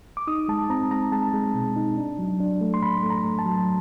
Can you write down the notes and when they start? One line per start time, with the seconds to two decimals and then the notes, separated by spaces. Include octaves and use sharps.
0.17 D6
0.27 D#4 D#6
0.48 G#3 A5
0.70 C4 A#5
0.91 G#3 A#5
1.12 G#3 A5
1.34 G#3
1.54 B2
1.76 D#4
1.97 D4
2.19 F#3
2.40 D4
2.61 A3
2.74 C6
2.82 A2 B5
3.03 A3
3.10 A#5
3.24 A3
3.39 A5
3.46 F#3